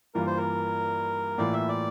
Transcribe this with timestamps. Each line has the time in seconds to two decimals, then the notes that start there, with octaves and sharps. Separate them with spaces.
0.15 G2 E3 A#3 F4 A#4
0.27 C5
0.37 A#4
1.38 A2 E3 A#3 F4 D5
1.53 E5
1.68 D5